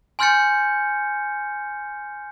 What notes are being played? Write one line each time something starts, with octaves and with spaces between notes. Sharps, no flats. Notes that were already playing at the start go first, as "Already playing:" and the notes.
G#5 C6 F6 G6 A6 C#7